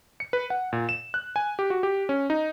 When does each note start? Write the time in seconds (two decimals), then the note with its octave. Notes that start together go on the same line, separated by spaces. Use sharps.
0.20 C#7
0.33 B4
0.50 F#5
0.73 A#2
0.89 E7
1.14 F#6
1.36 G#5
1.59 G4
1.70 F#4
1.83 G4
2.09 C#4
2.30 D#4